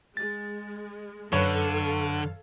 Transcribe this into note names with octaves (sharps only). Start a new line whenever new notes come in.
G#3 A6
F#2 D3 A4 B4 C#5 F5